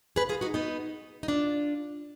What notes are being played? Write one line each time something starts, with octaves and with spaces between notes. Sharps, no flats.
G#4 B4
F4 G#4
D#4 F#4
B3 D#4
D#4
D4 F4